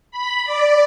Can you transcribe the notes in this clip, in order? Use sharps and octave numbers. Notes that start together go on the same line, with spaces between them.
B5
D5